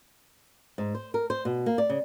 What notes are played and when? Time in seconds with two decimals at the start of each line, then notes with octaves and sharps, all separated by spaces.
0.78 G#2
0.95 C5
1.14 A#4
1.30 C5
1.45 B2
1.66 A#3
1.78 D5
1.90 C#3